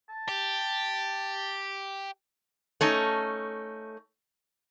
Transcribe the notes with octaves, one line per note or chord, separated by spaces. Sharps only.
A5
G4
A3 C#4 D#4